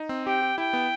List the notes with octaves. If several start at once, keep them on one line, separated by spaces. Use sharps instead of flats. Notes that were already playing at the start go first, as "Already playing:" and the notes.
Already playing: D#4
C4
G4 G5
G4
E4 G5
B3